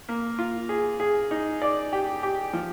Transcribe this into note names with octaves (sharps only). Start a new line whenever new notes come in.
A#3
F4
G#4
G#4
D#4
D5
G4
G4
F3